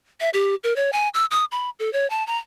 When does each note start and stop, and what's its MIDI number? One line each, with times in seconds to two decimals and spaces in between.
0.21 0.29 76
0.34 0.55 67
0.64 0.76 70
0.76 0.91 73
0.93 1.09 80
1.14 1.25 88
1.31 1.45 87
1.52 1.70 83
1.79 1.92 69
1.93 2.09 73
2.10 2.26 81
2.27 2.38 82